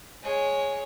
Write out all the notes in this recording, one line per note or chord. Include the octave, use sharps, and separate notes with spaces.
G#3 C#5